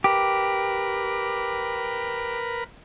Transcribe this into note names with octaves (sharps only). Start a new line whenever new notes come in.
G4 A#4 B4